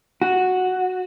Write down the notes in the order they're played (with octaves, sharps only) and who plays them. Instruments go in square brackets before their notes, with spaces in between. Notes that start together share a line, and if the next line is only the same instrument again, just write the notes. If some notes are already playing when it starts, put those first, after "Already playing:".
[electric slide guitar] F#4